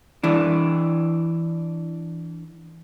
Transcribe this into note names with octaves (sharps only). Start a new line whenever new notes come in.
E3 D4